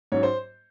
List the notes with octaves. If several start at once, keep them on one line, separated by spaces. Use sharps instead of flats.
G#2 F#3 C#4 C#5
C5